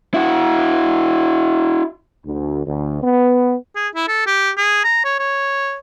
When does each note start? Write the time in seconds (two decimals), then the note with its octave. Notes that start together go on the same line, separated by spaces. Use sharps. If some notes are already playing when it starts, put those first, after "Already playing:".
0.14 E4 F#4
2.26 D2
2.67 D2
3.03 B3
3.76 G#4
3.95 E4
4.08 A4
4.27 G4
4.57 G#4
4.84 A#5
5.05 C#5
5.19 C#5